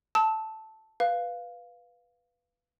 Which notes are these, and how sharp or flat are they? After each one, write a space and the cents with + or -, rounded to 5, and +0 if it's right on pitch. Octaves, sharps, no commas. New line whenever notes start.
A5 +0 E6 -35
B4 +0 F5 +0